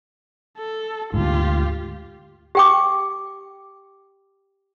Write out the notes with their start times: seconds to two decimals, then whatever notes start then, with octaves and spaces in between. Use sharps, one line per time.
0.58 A4
1.14 D2 G#2 F4 G4
2.55 G4 G5 D6